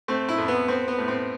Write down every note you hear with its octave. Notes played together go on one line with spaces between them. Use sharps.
A3 C4
E4
F2
B3
B3 C4
B3
A2
C4